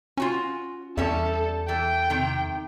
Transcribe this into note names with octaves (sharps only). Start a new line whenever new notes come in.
C#4 F4 F#4 G#5
E2 G3 C#4 A4 E5
E3 A4 G5
C3 D#3